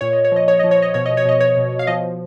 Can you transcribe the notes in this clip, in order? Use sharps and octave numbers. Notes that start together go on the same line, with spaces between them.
A#2 C#5
D#5
C#5
F3 D#5
C#5
F3 D#5
C#5
D#5
B2 C#5
D#5
C#5
B2 D#5
C#5
B2
F5
F3 D#5